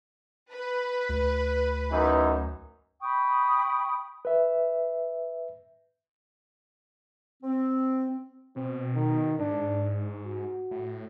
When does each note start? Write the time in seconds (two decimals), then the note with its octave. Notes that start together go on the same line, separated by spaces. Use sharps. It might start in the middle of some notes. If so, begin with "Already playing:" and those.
0.51 B4
1.09 D2
1.91 F#2 E3 D#4
3.00 G5 B5 C#6 D#6
4.25 B4 E5
7.43 C4
8.56 B2 C4
8.95 D#3
9.39 G#2 D4
10.25 F#4
10.71 A2